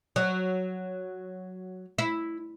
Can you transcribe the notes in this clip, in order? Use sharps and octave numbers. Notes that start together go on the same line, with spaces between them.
F#3
E4